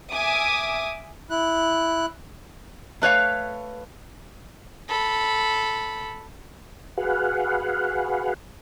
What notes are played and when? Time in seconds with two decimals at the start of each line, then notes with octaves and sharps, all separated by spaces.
0.11 E5 G#5 D6 D#6
1.30 E4 F#6
3.02 A3 B4 C#5 F5
4.89 A4 B5
6.97 F#4 G#4 B4 F5 F#5